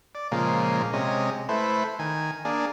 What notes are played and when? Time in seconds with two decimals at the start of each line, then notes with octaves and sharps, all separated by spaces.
0.15 D5
0.32 A#2 C#3 F3 G#3 A#3
0.93 C3 G#3 C#4 D#5
1.49 A3 E4 B4 C5
1.99 D#3 G#5
2.45 A#3 D4 G#4